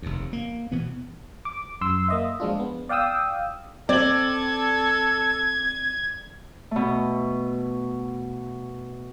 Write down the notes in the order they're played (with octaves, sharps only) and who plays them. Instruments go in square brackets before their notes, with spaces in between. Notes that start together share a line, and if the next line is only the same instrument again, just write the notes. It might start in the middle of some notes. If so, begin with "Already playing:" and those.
[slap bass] F1 D#2
A#3
B2 E3 B3
[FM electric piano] D6
F#2 C6 E6
A#3 D#5 E5
F3 G#3 D4 F4
B3
D5 F5 G5 D#6 E6
[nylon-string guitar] C4 [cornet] A4 [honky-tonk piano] D5 F#7 [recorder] G#6
[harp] B2 A3